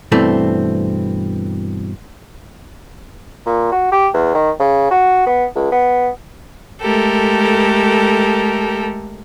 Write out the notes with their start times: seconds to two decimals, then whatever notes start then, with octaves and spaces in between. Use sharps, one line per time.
0.12 G2 B2 E3 A3 C4
3.46 A#2
3.72 F#4
3.92 G4
4.14 E2
4.34 D#3
4.60 C#3
4.91 F#4
5.27 B3
5.56 C#2
5.72 B3
6.82 G#3 A3 G4 A4 A#4